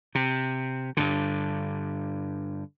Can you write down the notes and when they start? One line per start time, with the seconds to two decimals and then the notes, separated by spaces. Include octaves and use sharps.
0.15 C3
0.97 G2 D3